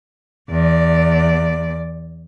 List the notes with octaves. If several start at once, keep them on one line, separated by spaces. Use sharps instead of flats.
E2 D5